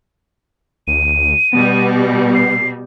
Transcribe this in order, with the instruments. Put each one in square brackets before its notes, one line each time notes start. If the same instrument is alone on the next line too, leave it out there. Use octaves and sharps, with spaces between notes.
[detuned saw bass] D2 [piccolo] D#7
[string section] B2 G3 [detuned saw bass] B3
[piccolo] C7